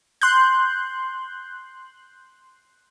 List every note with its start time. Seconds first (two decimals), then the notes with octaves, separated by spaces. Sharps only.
0.21 C6 F#6 G6